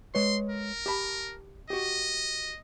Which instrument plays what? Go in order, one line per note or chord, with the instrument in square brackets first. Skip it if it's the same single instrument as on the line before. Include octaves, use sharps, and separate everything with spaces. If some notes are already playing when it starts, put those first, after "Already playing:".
[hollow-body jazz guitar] G#3 B4 C#5 [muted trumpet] C6
[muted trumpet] A#4
[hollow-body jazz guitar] G4 A5 B5
[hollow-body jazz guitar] F#4 G4 [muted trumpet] D#5